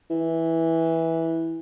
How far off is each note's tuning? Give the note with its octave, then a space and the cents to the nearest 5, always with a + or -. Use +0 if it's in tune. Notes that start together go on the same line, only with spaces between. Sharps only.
E3 -10